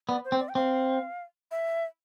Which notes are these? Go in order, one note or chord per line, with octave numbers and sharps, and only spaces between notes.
B3 D5
C5
C4
D5
G5
C4 F5
E5